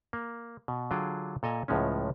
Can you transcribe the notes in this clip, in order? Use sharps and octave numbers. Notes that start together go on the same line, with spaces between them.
A#3
B2
D3 F#3 F4 G#4 G5
A#2 A4 D#5 G#5 A#5
C#2 A2 F3 G#3 C#4